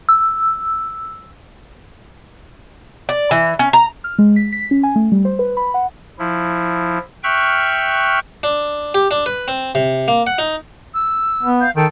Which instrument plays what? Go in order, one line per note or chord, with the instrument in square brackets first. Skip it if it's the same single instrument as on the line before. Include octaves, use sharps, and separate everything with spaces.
[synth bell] E6
[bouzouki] D5
E3
C#4
A#5
[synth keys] F6
G#3
B6
B6
C#4
G#5
A3
G3
C5
B4
B5
F#5
[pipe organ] F3 E4
E5 G5 C#6 F6 F#6
[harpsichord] D4
G4
D4
B4
C4
C3
A#3
F#5
D#4
[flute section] E6
[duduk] B3
[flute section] F5 G6
[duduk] D#3 [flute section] A4 G5